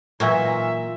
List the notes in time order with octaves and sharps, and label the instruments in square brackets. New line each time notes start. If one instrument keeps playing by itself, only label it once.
[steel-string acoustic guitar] A#2 [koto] E3 F#3 A#3 [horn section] D#4 F4 E5